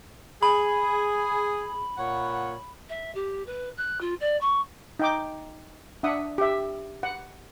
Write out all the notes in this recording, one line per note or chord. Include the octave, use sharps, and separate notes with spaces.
G#4 B5
A#2 C#5 F#5
E5
G4
B4
F#6
F4
D5
C#6
D#4 G5 D6
D4 E5 F#5 D#6
G4 E5
F#5